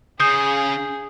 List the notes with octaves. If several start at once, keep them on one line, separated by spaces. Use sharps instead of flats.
C#3 G#4 D#6 G6